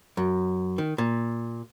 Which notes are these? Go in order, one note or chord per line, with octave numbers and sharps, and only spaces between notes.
F#2
D#3
A#2